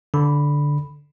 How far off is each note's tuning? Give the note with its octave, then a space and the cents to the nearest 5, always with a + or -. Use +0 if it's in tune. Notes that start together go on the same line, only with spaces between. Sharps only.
D3 -5 B5 +0